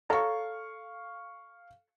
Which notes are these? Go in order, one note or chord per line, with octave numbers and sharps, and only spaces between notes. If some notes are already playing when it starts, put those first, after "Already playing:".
A4 C#5 F5 A#5 C#6